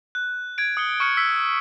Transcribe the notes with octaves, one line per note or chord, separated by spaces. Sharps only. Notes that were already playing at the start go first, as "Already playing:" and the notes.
F#6
G#6 D7
D#6 C#7 G7
C#6 F6 C#7 D7
E6 B6